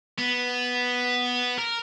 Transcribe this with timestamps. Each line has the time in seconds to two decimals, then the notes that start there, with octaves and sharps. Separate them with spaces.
0.19 B3
1.59 A#4